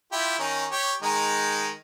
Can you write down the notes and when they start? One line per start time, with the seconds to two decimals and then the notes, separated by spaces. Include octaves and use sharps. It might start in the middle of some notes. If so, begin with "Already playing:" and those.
0.12 E4 F4 G4
0.39 D#3 C#4 D#4
0.71 G4 C#5
1.02 D#3 G#3 D#4